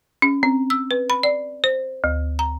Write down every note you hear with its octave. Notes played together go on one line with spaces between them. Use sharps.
C#4
C4
E6
B4
B5
D5
C5
D2
A#5